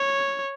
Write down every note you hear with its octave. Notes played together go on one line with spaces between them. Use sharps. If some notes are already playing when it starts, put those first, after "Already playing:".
Already playing: C#5